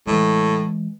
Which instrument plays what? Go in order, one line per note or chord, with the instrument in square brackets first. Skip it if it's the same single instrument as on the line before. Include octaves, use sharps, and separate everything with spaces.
[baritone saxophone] A2 [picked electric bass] E3 G#3